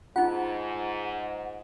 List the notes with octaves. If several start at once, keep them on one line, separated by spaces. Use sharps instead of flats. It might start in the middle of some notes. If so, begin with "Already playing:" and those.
G#2 D#4 F4 F#5